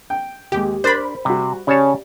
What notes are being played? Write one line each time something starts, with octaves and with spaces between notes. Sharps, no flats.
G5
D#2 G#3 G4
D4 A#4 C5 B5
C3 G3 F#4
C#3 C#4 G4 C#5 D5 A5